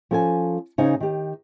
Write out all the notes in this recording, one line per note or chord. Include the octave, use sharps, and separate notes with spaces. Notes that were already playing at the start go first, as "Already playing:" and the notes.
F3 C#4 A4 G5 G#5
C#3 D#4 C5 G#5
D#3 G4